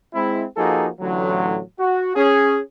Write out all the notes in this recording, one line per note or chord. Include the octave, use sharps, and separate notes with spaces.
G#3 C4 E4
F3 A#3 D#4 F#4 G#4 A4
A1 A2 D3 F#3
F#4
C#4 G#4